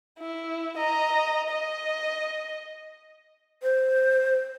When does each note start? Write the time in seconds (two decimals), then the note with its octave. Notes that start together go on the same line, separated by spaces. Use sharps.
0.19 E4
0.77 D#5 A#5
1.50 D#5
3.63 C5